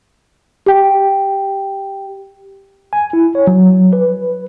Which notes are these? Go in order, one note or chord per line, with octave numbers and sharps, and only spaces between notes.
G4 G5
G#5
E4
C#5
F#3
B4